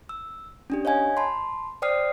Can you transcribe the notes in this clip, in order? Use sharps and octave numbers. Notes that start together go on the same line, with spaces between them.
E6
C#4 D4 G4
C#5 D#5 F5 G#5 G#6
A5 B5 C6
C5 D5 G5 D#6 F6 C7